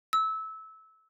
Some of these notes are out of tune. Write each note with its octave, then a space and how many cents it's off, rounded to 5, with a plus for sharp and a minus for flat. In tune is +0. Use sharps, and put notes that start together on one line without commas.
E6 -20